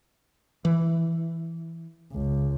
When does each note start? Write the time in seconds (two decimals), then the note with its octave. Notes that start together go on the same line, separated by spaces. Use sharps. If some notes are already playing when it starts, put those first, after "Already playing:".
0.65 E3
2.12 C#2